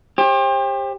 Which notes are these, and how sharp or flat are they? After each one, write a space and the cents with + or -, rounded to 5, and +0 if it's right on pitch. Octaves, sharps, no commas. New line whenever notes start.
G4 +25 C5 +40